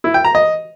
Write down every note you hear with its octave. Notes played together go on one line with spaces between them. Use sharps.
E4
G5
A#5
D#5